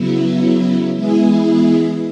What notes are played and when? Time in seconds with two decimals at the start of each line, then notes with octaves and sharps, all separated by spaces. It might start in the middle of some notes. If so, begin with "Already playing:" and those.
Already playing: C#3 F#3 B3 E4
0.94 E3 G#3 B3 E4 G#4